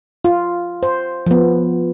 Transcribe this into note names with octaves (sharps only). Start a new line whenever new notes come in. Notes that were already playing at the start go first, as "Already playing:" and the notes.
F4
C5
F3 B3